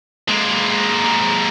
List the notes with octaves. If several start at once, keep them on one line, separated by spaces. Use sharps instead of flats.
G#3 A#3